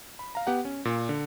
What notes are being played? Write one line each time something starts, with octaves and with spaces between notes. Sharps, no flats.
B5
F5 A#5
B3 G4 F#5
C#4
A#2
D3